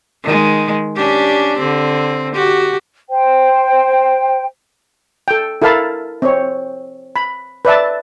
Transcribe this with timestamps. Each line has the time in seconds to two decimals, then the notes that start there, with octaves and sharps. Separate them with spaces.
0.23 D#3 G#3
0.95 C#4 D4 G4
1.58 D3 C4
2.34 F#4 G4
3.09 C5 G5
5.28 A4 G5
5.62 E4 A4 A#4 F5 A5 B5
6.22 C4 C#5
7.16 B5
7.65 B4 D5 E5 A5